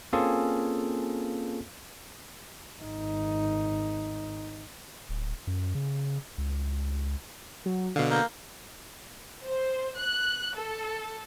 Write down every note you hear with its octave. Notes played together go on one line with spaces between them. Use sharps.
A#3 C4 C#4 F4 G#4 A4
G#1 D#4
D1
F#2
C#3
C#2
F#3
B2 D3 F5
A#3 G6
C5
F#6
A4